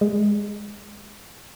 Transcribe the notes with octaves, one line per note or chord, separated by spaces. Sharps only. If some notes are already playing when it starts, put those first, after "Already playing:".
G#3